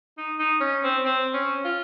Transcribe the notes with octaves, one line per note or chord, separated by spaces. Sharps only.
D#4
D#4
C#4
C4
C4
C#4
F4